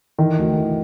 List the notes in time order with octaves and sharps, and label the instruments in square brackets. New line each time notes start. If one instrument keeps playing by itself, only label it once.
[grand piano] D#3 [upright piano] E3
[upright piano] D2
E3